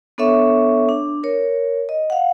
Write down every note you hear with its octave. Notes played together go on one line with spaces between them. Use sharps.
B3 D4 A4 C#5 E5 C#6
D4
A#4 C#5
D#5
F5 F#5